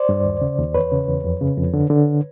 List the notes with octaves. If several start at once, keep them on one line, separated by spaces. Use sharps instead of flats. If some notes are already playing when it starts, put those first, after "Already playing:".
Already playing: C5 D5
G2
D#2
C#3
D#2
E2 B4 C#5
C#3
E2
F2
C#3
F2
D3
D3